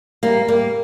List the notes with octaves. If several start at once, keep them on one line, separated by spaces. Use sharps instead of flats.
G3 A#3
G3 A#3